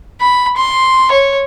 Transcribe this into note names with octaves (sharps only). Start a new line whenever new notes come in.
B5
C6
C#5